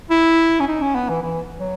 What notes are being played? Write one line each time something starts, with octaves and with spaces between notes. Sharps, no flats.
E4
C#4
D#4
C#4
B3
E3
E3
F#3